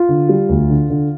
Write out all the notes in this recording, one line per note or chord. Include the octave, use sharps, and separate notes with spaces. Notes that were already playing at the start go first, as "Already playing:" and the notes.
Already playing: F4
D3
G3
D2
D3
D3